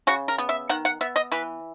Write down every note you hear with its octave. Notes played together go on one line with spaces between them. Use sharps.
C#3 F#4
A#4
B3
E5
D#3 F#5
F#5
B3 E5
D#5
E3 B4